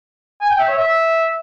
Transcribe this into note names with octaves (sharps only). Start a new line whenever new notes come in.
G#5
G5
E5
C#5
E5